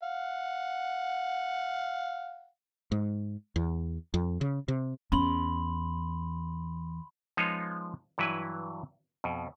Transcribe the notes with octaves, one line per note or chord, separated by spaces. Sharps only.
F5 F#5
G#2
E2
F2
C#3
C3
E2 C#4 B5 C6 F#7
F3 G#3 B3 D#4 F4 C#5
G2 E3 F#3 E4 B4 G#5
F2 B2